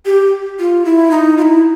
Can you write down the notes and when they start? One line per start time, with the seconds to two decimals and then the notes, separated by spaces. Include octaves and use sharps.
0.06 G4
0.59 F4
0.85 E4
1.11 D#4
1.38 F4
1.42 E4